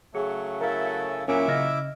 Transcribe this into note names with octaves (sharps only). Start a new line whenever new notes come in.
C#3 F#3 A3 G#4
E4 A4 A#4 F5
A#2 F#3 C#4 E4 A#4 E5 G#5 D6
C#3 D#5 F6 A#6